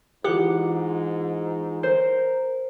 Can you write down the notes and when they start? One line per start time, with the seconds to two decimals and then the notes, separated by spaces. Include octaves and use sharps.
0.24 G#2 E3 E4 F4 G4 F#5
1.83 A#4 C5